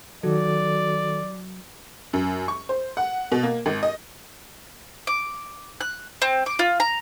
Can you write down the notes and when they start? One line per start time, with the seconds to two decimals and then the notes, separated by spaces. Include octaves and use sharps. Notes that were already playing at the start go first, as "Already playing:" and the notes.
0.23 D#3 F#3 F#4 A4 D5
2.13 F#2
2.48 C#6
2.69 C5
2.97 F#5
3.32 B2
3.43 A#3
3.66 G#1
3.83 D#5
5.07 D6
5.81 F#6
6.22 C4
6.46 D6
6.59 F4
6.80 A#5